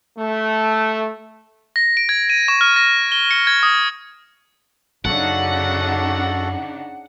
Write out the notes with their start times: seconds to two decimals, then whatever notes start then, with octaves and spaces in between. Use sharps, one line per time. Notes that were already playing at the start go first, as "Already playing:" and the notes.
0.18 A3
1.76 A#6
1.97 D7
2.09 G#6
2.30 D#7
2.48 C#6
2.61 F6
2.76 A#6
3.12 G7
3.31 C#7
3.47 G#6
3.63 D#6
5.05 F#2 C#3 D4 D#4 F#4 A4 F#5